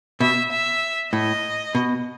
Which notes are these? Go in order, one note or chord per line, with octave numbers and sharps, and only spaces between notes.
B2 E5
E5
A2 D#5
B2